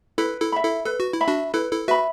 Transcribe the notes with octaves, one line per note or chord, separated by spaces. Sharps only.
E4 A4 B4
E4 A4
E5 B5
E4 A4
A4 B4
F#4
E4
E5 B5
D4 F#4
E4 A4 B4
E4 A4
F#4 B4 E5 B5